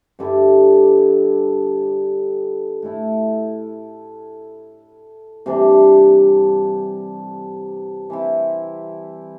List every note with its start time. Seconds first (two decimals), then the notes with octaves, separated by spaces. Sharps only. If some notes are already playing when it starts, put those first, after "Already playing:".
0.19 G2 D3 G3 E4
2.82 A2 A3 E4
5.46 C3 E3 G3 D4
8.10 E3 C4 E4